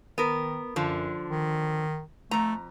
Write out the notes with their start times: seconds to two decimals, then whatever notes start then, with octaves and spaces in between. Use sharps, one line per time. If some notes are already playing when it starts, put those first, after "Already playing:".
0.18 D#3 B3 A#4
0.76 F#2 D3 F3 D4
1.30 D#3
2.31 F2 A3 A#5